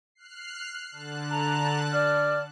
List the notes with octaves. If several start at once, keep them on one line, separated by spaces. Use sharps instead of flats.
F6 F#6 C7
D3 A5 F#6
A#5
D5 F6